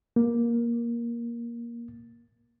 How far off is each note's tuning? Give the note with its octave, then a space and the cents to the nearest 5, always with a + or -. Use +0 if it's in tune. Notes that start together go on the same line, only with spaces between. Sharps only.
A#3 +15